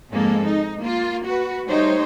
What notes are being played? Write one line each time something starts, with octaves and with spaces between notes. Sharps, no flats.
F2 G#2 G#3 A#3 A4
D#4
A#3 F4
F#4 B4
G3 A3 D#4 C5 C#5